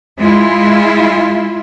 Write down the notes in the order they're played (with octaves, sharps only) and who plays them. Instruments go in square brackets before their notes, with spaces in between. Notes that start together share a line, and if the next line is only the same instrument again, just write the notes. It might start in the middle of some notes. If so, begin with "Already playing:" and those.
[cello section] G#3 E4 F4